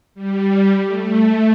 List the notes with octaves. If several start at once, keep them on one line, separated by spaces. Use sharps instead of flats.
G3
A3